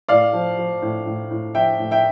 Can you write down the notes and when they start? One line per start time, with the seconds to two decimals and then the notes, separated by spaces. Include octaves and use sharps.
0.08 A2 D5 F5
0.33 F3
0.58 F3
0.82 A2
1.06 A2
1.31 A2
1.54 F3 E5 G5
1.79 A2
1.91 E5 G5